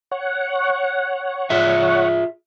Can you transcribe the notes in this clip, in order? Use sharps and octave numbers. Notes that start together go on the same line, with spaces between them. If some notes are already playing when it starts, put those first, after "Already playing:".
C#5 F#5
F4 G#4 E5